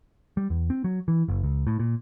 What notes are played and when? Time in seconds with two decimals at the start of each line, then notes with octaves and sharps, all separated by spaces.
0.37 G3
0.50 E2
0.70 C4
0.84 F#3
1.08 E3
1.28 F#1
1.43 C#2
1.67 A2
1.79 A#2